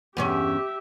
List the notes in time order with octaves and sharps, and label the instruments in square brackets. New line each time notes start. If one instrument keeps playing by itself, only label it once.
[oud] E2 G2 C#4 [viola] G4 E5